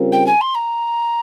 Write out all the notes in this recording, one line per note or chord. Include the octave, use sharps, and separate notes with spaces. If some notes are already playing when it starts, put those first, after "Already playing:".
Already playing: C#3 G3 C4 F4 A#4
G5
G#5
C6
A#5